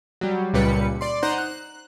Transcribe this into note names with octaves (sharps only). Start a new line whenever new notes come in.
F#3 G3
C#2 A#2 G3 B4 C#7
D5 C6
D#4 C5 F#5 A#5
F#6